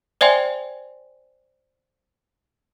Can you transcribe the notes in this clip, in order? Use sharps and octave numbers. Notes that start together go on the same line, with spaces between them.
C5 D5 E5 G5 G#5 C6